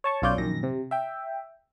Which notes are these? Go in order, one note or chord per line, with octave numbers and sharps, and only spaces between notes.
C#5 A5 C#6
B1 F#2 F4 C#5 D5 G6
A#1 F#2 D#3 A#6
C3
E5 G5